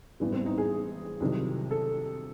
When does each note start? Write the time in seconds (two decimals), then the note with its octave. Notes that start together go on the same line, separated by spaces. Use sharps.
0.20 A1 G#2 E3 G3 B3
0.33 C4
0.46 D#4
0.58 G#4
1.20 C2 C3 D#3 F#3
1.71 A4